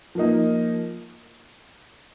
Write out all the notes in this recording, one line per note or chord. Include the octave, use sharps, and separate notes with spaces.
F3 A#3 D#4